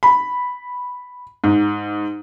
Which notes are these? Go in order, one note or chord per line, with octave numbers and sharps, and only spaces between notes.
B5
G#2